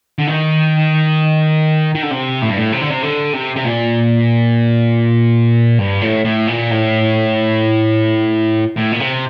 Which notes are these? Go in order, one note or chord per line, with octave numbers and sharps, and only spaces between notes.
D3
D#3
D#3
D3
C3
A2
G2
A2
C3
D3
C3
D3
C3
C3
A#2
G2
A2
A2
A#2
A2
A2
A#2
C3